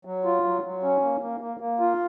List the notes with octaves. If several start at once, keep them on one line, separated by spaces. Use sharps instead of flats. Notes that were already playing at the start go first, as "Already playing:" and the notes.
F#3
F4
F#3
F#3
C#4
A#3
A#3
A#3
A#3
F4